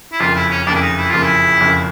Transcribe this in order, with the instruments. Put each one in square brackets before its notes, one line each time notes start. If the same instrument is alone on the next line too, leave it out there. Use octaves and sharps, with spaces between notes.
[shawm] E4
[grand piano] F#1 F2 C#3 [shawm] F4
[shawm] E4
C#4
[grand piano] F#1 F2 C#3 [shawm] D4
[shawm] E4
D#4
E4
[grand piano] F#1 F2 C#3 [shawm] F4
[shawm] E4
[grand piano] F#1 F2 C#3